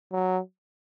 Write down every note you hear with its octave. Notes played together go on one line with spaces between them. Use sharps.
F#3